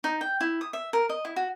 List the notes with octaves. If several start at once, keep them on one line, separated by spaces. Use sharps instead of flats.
D#4
G5
E4
D#6
E5
A#4
D#5
E4
F#4